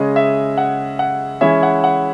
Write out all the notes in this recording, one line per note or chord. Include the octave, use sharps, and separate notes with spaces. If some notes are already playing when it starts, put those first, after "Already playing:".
Already playing: C#3 G#3 C#4 D#5
E5
F#5
F#5
E3 G#3 C#4 E4 E5
F#5
F#5